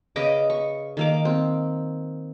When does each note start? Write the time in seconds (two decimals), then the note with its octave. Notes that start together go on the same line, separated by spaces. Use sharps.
0.16 C#3 B4 D#5 D6
0.50 C#6
0.97 D#3 A#3 D6
1.25 C4